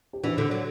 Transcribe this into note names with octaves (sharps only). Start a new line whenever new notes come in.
G4
E3 D4 F#4
D3
F#3